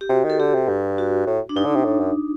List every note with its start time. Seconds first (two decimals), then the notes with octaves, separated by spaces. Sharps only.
0.01 G4
0.09 C3 F#4
0.24 D#3
0.30 A4
0.39 D3 G4
0.54 C3
0.69 G2
0.98 F#4
1.27 A2
1.49 D4
1.56 G2 D#4
1.66 D3
1.76 C3
1.85 A2
2.00 F#2